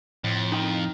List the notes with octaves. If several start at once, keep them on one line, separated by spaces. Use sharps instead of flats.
F2 A2
D#4 G5